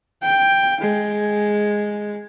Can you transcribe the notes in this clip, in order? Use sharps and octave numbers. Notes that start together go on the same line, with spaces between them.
G5
G#3